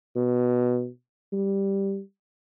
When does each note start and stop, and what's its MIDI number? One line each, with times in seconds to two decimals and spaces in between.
0.16 0.88 47
1.33 2.00 55